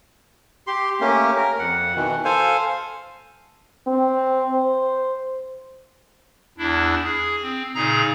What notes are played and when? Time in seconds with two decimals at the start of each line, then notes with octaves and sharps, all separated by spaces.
0.67 G4 C6
1.01 A3 A#3 C#4 G4
1.37 A#4
1.59 F2 F#5
1.95 B2 D#3 E3
2.25 A4 C5 F5 G#5
3.87 C4
4.52 C5
6.58 E2 D4 E4
7.04 G#4
7.43 C4
7.75 A#2 C#3 D#4 G#4 A#5 A#6